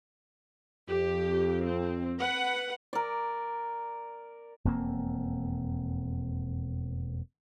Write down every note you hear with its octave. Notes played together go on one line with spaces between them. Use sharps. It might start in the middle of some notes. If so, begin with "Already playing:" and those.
F2 G4
C4
B4 F#5
A#4 D5
E1 F2 A#3 C4